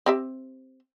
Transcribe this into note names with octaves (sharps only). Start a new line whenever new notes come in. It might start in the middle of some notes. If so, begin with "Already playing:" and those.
C4 G4 E5